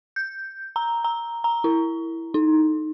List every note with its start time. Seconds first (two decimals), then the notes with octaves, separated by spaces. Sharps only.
0.16 G6
0.76 A#5
1.04 A#5
1.44 A#5
1.64 E4
2.34 D#4